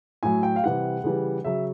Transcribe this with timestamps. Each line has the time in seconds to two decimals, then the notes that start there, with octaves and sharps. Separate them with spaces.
0.23 A2 F#3 G#5
0.43 G5
0.56 F5
0.64 C3 E3 G3 F#5
1.04 C#3 E3 G3
1.45 C#3 F#3 E5